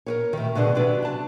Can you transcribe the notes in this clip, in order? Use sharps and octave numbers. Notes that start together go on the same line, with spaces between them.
A#4 B4 C#5
A2 D#3
B2 D3 D4 F#4 G#4
C3 F#3 D4 B4 D5
D4 A5